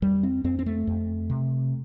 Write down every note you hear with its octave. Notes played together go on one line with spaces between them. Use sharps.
F2 G3
C4
F2 C4
C4
A3
F2
C3